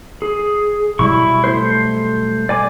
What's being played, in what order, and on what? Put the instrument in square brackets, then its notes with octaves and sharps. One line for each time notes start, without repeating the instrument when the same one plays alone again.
[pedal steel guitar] G#4
[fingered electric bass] B2 F#3 G3 [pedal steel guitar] E4 C#6
[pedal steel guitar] A3 C5
D5 G#5 D6